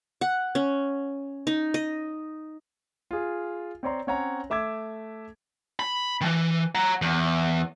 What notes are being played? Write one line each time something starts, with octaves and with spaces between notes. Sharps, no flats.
F#5
C#4
D#4
D#5
F4 G#4
C4 C#5 D5 A#5 C6
C4 C#4 C#5 F#5 G#5 A#5
A3 E5 D6 E6 G#6
B5
D#3 E3
F#5 A#5
E2